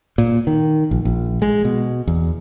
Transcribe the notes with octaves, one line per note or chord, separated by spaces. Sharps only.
A#2
D#3
A#1
A#1
G#3
B2
E2